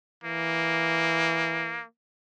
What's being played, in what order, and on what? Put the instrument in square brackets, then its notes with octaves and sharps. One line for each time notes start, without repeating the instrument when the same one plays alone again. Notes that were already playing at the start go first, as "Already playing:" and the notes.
[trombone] E3 [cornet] A#3